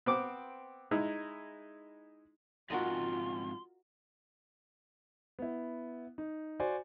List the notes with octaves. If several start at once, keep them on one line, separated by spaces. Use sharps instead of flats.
B3 C4 D6
G#3 D#4 E4
F2 G#2 F4 F#4 A#4 D#5 C6
B3 E4
D#4
F#4 C5 D5 G#5